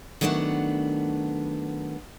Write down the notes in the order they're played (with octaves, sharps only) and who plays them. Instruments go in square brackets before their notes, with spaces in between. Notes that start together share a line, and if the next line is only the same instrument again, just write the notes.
[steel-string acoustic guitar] D#3 F#3 A3 B3 D4 F#5